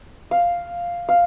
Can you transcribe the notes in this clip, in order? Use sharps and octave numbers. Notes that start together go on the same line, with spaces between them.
F5
F5